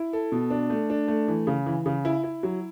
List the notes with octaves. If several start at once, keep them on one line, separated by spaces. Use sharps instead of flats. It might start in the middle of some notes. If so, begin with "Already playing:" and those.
Already playing: E4
A4
B2
D4
A3
D4
A3
E3
C#3
E3
C#3
E4
E4
F#3